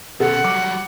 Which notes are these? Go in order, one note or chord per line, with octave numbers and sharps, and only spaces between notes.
B2 C#4 A4 F#5
F#3 G3 D6